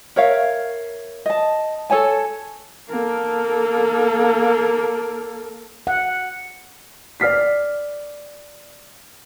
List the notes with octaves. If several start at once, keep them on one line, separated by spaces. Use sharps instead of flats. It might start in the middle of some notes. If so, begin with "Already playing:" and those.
A#4 C#5 E5 F5
D#5 A5
A4 C#5 G#5 A5
A#3 A4
F#5
D5 F6 B6 C7